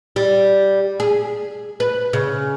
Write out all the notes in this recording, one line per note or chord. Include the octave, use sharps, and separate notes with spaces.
G3
G#4
B4
C#3